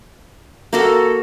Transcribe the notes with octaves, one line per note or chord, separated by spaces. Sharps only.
A#3 F#4 A4